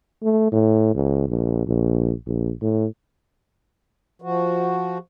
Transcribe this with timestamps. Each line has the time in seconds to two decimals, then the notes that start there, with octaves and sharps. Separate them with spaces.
0.23 A3
0.52 A2
0.94 C#2
1.28 A#1
1.67 A#1
2.26 A#1
2.62 A2
4.22 F3 F#4